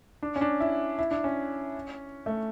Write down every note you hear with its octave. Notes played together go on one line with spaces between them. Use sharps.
D4
C#4
D4
E4
E4
D4
C#4
A3